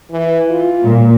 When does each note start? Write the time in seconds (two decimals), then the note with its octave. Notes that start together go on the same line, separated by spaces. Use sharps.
0.11 E3
0.50 F4
0.83 A#2